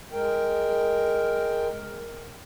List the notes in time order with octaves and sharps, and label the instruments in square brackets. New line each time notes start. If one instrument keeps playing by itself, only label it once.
[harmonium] G#3 A#4 G5